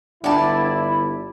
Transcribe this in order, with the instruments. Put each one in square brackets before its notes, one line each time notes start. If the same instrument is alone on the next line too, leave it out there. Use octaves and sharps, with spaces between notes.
[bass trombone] G1 [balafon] D4 F#5 B5 [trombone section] E4 [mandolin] D5 A5